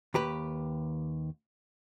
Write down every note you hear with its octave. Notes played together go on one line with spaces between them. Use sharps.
D#2 G4 B4